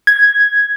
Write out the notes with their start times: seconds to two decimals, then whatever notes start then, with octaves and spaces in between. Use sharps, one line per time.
0.07 G#6